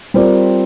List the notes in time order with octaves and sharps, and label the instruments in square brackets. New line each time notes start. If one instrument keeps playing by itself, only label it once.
[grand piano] G3 C4 F4 A#4 D5